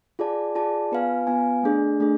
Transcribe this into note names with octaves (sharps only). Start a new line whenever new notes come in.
F4 G#4 D5 A5
F4 G#4 D5 A5
B3 F4 B4 F5 G#5
B3 F4 B4 F5 G#5
A3 D4 G#4
A3 D4 G#4